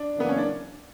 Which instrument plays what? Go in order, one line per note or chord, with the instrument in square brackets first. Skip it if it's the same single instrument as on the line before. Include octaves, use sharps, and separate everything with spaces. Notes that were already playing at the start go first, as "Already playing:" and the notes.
Already playing: [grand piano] D4
[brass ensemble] F#2 C#3 E3 A#3 [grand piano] B3
[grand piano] C#4
D4